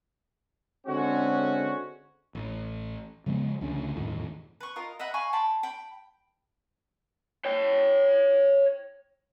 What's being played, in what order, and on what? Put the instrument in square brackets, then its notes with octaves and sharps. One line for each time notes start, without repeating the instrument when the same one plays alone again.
[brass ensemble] D3 G#3 C4 C#4 F#4
[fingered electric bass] A1
C#3 F3 G#3 B3
C#2 D3 A3 C#4
G1 E2 A2 D#3
[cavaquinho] B4 C#6
F4 A#4 D#5
D#5 E5 F#5 B5
F5 G#5 B5 C#6
G5 A5 B5 C6
G5 B5
[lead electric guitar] C#5 G5